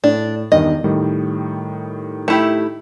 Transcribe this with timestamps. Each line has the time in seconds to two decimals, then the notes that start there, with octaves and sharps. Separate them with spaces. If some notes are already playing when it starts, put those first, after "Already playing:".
0.04 A2 D4
0.52 E2 G2 D#3 D#5
0.84 A2 D#3 G3
2.28 A3 E4 G4